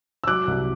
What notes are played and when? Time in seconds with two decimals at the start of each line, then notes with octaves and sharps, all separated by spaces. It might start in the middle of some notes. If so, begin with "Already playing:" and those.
0.24 E6
0.27 F#3 D6 F#6
0.48 C2